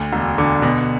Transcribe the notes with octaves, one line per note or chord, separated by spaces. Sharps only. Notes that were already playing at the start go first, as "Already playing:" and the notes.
Already playing: D2
E1
D3
B2